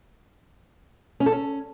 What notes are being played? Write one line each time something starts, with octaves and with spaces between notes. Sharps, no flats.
C#4
A4
C#4